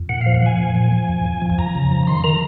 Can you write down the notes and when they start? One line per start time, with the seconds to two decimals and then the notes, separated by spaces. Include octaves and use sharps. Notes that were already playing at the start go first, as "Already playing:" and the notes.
Already playing: F2
0.09 A#2 F#5
0.21 F3 F5
0.35 F#5
0.42 F3 G#5
0.58 A#2
0.75 F3
0.92 F3
1.09 F2
1.25 F2
1.42 F3
1.50 G#5
1.58 F2 A#5
1.75 C#3
1.91 F3
2.07 D#3 C6
2.24 D#3 A#5